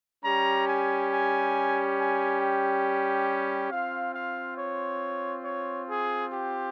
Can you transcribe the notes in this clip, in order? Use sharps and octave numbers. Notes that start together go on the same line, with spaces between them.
G3 C#4 G4 A#5
G#5
G#5
G#5
G5
C4 F4 F5
F5
C#5
C#5
G#4
G4